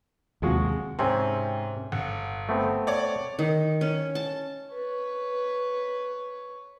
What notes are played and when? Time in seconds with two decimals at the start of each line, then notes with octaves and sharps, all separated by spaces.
0.42 D#2 C3 F3 G#3 F#4
0.99 G#2 C3 C4 C#4
1.92 G1 F#5
2.49 A3 B3 C4
2.87 C#5 D5
3.39 D#3
3.81 C#4
4.15 A5
4.72 B4 C#5